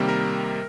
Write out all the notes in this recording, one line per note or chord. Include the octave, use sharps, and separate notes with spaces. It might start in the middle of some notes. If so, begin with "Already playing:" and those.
Already playing: C3 D#3 G3 A#3
A#4